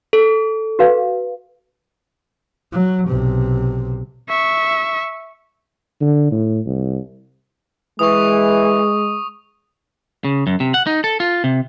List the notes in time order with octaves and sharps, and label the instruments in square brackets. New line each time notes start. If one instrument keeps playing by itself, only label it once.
[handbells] A4
[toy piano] F#4 B4 F5
[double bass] F#3
B1 C3
[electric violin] E5 C#6
[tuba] D3
A2
C2
[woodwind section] E3 [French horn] G#3 [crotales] C#6 D#6
[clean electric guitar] C#3
F#2
C3
F#5
D#4
A4
F4
C3